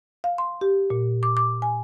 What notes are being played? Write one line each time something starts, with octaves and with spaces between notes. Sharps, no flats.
F5
C6
G4
A#2
D6
D6
G#5